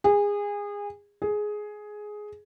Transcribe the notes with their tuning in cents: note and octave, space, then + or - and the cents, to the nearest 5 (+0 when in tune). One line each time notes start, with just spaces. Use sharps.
G#4 -25
G#4 +10